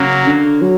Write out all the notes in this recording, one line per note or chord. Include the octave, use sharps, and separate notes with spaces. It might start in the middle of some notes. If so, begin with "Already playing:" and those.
Already playing: C#3 F#3 A#3
D3
F#3